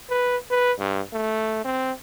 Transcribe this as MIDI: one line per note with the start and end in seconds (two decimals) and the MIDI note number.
0.10 0.37 71
0.51 0.72 71
0.79 1.01 43
1.13 1.64 57
1.65 1.92 60